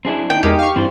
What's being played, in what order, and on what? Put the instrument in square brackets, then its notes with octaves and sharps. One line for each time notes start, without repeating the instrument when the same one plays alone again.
[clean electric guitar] F#2 G#4 E5 [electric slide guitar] C4 D4 E4
[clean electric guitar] D#2 D#4 [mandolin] G5
[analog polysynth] E2 G#3 A#4 [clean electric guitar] D#4 [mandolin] G4
[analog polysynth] F5 C#6
[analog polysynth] G2 [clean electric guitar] E3 C5 [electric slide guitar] C4 D5